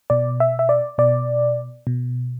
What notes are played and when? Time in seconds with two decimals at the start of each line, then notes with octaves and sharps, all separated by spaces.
0.10 B2 D5
0.40 E5
0.59 E5
0.69 D5
0.98 B2 D5
1.87 B2